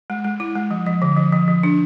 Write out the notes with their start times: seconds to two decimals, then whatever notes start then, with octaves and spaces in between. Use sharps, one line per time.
0.10 G#3
0.24 G#3
0.40 E4
0.55 G#3
0.71 F3
0.86 F3
1.02 D3
1.17 F3
1.32 F3
1.48 F3
1.63 D4